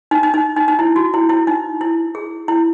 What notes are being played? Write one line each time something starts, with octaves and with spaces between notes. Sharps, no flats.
D#4
D#4
D#4
D#4
D#4
E4
F#4
E4
E4
D#4
E4
G#4
E4